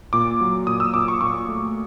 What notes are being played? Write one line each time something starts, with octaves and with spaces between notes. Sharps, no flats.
A#2 D6
F#3
A#2 D#6
E6
A#2 D6
C#6
A#2 C#6
A3